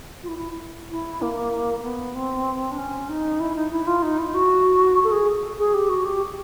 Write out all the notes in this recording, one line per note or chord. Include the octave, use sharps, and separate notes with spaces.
F4
E4
E4
E4
A#3
A#3
B3
C4
D4
C#4
D#4
E4
D#4
E4
F4
D#4
E4
F#4
A4
G#4
G#4
G4
F#4
G4